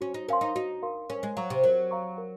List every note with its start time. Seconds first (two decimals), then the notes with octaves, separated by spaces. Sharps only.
0.01 C#4 F#4
0.14 D#4
0.28 C#4 A#4 F5 C6
0.41 D#4
0.55 D#4 F#4
0.82 A#4 F5 C6
1.10 C#4 A#4
1.23 G#3
1.36 F#3 F5 A#5 C#6
1.50 C3
1.63 F#3 A#4
1.91 F5 A#5 C#6
2.18 A#4